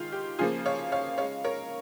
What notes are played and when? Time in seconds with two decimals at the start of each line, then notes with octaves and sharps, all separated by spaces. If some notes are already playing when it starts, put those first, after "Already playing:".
Already playing: D#3 G#3 F4
0.12 G4
0.39 C#3 F3 A#3 F4 G#4
0.66 C#5 F5
0.92 C#5 F5
1.18 C#3 G#3 C#5 F5
1.44 A#4 C#5